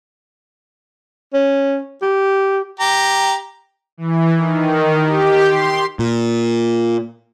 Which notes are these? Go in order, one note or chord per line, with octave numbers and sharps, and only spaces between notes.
C#4
G4
G4 A#5
E3
D#3
G4
C6
A#2